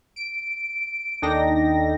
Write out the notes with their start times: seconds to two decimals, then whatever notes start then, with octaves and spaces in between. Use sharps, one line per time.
0.16 D7
1.22 D#2 D4 D#4 A4 G5 A#6